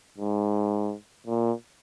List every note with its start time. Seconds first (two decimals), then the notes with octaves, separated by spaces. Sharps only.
0.18 G#2
1.26 A#2